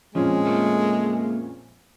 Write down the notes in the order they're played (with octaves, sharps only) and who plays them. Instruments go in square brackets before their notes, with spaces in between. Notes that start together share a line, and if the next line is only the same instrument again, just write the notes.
[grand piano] F2 A#2 C#4 [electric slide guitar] F3 [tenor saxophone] G#3
[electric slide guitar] A3 A#3 A4